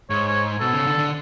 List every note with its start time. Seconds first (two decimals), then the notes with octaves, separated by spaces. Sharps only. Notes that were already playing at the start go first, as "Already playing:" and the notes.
0.10 G#2 C#5
0.28 C#5
0.60 B2 A4
0.73 C#3
0.86 D3
0.99 D3